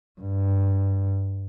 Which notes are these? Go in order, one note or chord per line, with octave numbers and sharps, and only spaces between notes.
G2